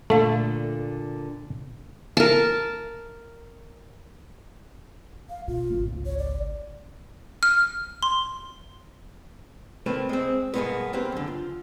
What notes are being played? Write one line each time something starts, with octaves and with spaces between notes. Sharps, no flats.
A#2 D3 A3 A4 F5
A#4 A5
F5
B2 F4
G#1 C#2
C#5
D5
F6
C6
A3 A#3 C4 B4
G#3 C4
G2 B2 D3 G#3 A#3 B3
A#3 C4 G4 B4 C5
F#2 D3
F4